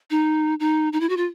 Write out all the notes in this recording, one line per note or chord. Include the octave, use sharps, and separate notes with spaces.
D#4
D#4
D#4
E4
F#4
F4